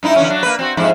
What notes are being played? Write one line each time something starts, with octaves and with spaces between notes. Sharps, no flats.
G2 D#4 E4
D3 E3 C#4
F#3 D4
A#3 B4
C4 F#4
F2 G#2 E4